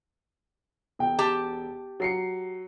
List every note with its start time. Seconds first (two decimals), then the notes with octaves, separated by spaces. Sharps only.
0.99 E1 G5
1.19 G4 A5
2.00 F#3 C7 C#7